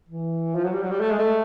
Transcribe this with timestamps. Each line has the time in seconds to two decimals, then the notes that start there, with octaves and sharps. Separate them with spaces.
0.09 E3
0.55 F3
0.64 F#3
0.73 G3
0.83 F#3
0.91 G3
1.00 A3
1.10 G#3
1.18 A3